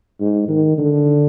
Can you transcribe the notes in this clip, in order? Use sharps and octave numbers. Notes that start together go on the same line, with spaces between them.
G#2
D#3
D3